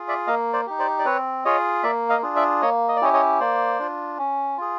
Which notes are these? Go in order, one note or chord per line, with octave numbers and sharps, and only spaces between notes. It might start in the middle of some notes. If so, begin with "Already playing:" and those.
Already playing: F4 G#4
D5 E5
A#3 D#5 F5
C5 D5
D#4 G4
C5 D5
D5
C4 B4 C#5
F4 G#4 C#5 D#5
A#3 D5 E5
D#5 F5
D4 F4 G#4
D5 E5
A#3 C#5 D#5
D#5
D5
C#4 E4 G4 C#5 D#5
C#5 D#5
A#3 C5 D5
D4 F4
C#4
F4 G#4